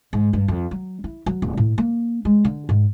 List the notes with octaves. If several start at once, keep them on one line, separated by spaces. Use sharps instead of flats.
G#2
G2
F2
F#3
E4
F#3
D1
A2
A#3
G#3
D3
G#2